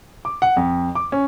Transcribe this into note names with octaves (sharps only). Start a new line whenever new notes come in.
D6
F#5
F2
D6
C#4